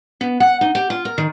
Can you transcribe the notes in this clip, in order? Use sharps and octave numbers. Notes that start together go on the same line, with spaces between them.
B3
F#5
D#4
G4
F4
A#4
D#3